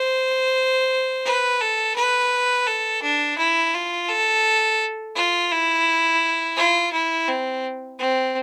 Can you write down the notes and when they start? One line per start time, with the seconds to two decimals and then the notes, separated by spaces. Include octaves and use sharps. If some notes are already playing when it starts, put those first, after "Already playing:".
Already playing: C5
1.25 B4
1.61 A4
1.96 B4
2.67 A4
3.02 D4
3.38 E4
3.74 F4
4.08 A4
5.16 F4
5.51 E4
6.57 F4
6.93 E4
7.28 C4
7.99 C4